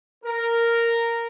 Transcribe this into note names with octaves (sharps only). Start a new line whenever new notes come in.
A#4